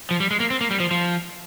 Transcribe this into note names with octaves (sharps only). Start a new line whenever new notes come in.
F3
G3
G#3
A#3
C4
A#3
G3
F3
F3